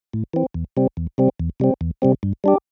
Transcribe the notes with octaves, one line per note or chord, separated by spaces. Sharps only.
A2
E3 C4
E2
C3 G3 C4
E2
C3 G3 C4
E2
C3 G3 C4
E2
C3 G3 C4
G2
G3 D4 G4